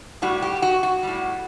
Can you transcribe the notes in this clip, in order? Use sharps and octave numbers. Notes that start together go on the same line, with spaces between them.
A2 G3 F#4
G4
F#4
F#4
A2 G3